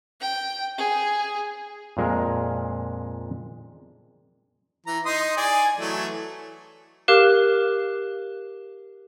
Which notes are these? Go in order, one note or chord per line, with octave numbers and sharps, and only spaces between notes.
G5
G#4
F2 A#2 G#3 A#4
E3 A#5
D#4 C6 D#6
G#4 D5 G#5
E3 F#3 A3
G4 A#4 F5 D6 F#6